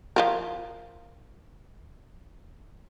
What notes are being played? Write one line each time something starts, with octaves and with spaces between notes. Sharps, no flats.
F3 F4 A#4